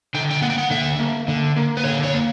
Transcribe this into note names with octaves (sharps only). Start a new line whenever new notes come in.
D3 G5
G5
A#3 F#5
G5
F#5
D3 E5
A#3
D3
A#3
B4
D3 C#5
C#5
A#3